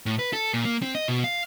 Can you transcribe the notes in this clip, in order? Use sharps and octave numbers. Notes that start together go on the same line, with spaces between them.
A2
B4
A4
A#2
A#3
C4
D#5
B2
F5